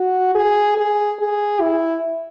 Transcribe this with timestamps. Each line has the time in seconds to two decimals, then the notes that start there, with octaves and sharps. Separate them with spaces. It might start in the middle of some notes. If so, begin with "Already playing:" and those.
Already playing: F#4
0.35 G#4
0.77 G#4
1.20 G#4
1.61 E4